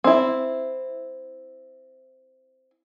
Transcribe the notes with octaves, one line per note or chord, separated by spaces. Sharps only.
C4 E4